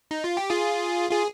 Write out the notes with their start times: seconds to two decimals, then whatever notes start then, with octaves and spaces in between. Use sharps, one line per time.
0.11 D#4
0.24 F4
0.37 G4
0.50 F4 G#4
1.11 F4 G#4